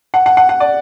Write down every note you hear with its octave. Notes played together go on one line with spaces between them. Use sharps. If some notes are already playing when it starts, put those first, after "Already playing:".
F#5
F#5
F#5
F#5
D5